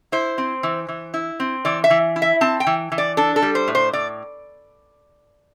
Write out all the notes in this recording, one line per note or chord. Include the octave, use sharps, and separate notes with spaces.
E4 C5
C4
E3
E3
E4
C4
E3 D5
E5
E3
E4
E5
C4 A5
G5
E3
E3
D5
D4 A4
A4
G3
C5
A2
C5
A2 D5